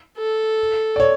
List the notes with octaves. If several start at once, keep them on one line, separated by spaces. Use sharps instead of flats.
A4
D5
C#5